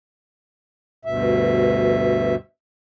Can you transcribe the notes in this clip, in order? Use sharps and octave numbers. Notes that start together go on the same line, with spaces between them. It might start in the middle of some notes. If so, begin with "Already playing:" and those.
D2 G2 B2 E5